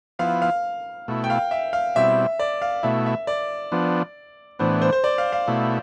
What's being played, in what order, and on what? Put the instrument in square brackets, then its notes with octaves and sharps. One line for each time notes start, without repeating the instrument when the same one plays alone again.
[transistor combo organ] F3 B3 E4 [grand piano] F5
[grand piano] F5
[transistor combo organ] B2 A3 E4
[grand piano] G5
F5
E5
F5
[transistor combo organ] B2 G3 C4 E4 [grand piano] E5
[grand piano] D5
F5
[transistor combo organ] B2 A3 E4 [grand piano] E5
[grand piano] E5
D5
[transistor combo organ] F3 B3 D4
[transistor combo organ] A2 E3 B3 D4 [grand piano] C5
[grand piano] C5
C5
D5
F5
F5
[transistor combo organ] B2 A3 E4